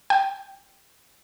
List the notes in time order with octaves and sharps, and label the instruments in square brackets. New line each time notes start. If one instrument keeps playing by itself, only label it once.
[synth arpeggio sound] G5